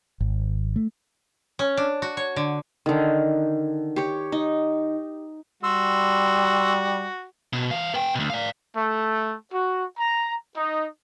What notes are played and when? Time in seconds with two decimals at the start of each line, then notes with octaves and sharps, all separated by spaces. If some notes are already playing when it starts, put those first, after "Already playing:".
0.20 G#1
0.76 A3
1.59 C#4
1.77 D4
2.02 F#4
2.17 C#5
2.36 D3
2.86 D3 D#3
3.96 G4 C#5
4.32 D#4
5.63 G3 F#4 C6 E6
7.53 B2
7.71 E3 F5
7.94 B3 G5
8.15 D2 B2
8.30 D5 F5
8.75 A3
9.52 F#4
9.98 A#5
10.55 D#4